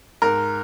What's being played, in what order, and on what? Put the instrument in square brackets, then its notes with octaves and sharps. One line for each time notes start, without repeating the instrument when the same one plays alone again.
[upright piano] G#2 A#4